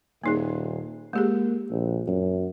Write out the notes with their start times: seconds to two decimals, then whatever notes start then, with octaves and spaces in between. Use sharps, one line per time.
0.24 D#1 A#3 D#4 G#4
1.13 G#3 A#3 G4 G#4
1.70 A#1
2.07 F#2